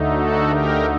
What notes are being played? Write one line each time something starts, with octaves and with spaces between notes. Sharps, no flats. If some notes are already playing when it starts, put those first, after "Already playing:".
Already playing: D2 D3 A3 D#4
F#4 A4
G4 A#4